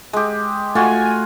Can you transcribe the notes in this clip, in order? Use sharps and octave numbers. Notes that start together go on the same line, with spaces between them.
G#3 G4
A3 F4 F#4 G#5